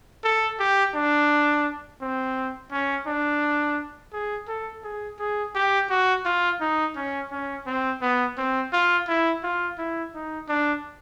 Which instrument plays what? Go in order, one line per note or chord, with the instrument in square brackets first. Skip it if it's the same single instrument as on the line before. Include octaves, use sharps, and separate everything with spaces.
[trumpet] A4
G4
D4
C4
C#4
D4
G#4
A4
G#4
G#4
G4
F#4
F4
D#4
C#4
C#4
C4
B3
C4
F4
E4
F4
E4
D#4
D4